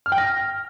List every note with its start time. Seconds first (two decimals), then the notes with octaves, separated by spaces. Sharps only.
0.06 F6
0.12 G5
0.18 A#6